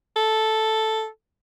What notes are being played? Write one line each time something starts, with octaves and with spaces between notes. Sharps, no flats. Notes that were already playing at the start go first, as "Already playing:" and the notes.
A4